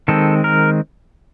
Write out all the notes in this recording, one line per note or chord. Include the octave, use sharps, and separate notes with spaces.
D#3 G#3 C4 A4
A#4